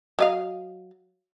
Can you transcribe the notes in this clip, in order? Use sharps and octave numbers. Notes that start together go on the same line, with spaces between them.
F#3 D#5 F5